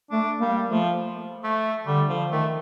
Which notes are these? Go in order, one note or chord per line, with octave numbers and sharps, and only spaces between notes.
A3 D4
G3 A#3
F3 A3
A3
D3 G3
F3
D#3 A3